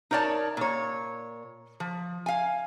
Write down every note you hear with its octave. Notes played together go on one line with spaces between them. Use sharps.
D#4 A#4 C#5 D5 A5
A#2 C#5
F3
F5 G#5